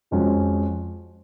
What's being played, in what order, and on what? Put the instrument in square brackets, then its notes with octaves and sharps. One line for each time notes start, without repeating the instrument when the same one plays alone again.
[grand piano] F2 F3 G#3 C#4 F#4